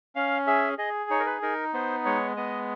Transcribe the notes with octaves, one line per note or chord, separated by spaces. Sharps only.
C#4 F5
G#4 E5
G#4 D#5
D#4 C#5
A#4
B4
D#4 A#4
B3 C5
G#3 C#5
B3 D#5